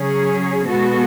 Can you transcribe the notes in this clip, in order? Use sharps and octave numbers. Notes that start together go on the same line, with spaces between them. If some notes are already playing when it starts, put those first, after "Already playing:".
Already playing: C#3 F#3 C#4 G#4 C#5
B2 G#3 B3 F#4 A4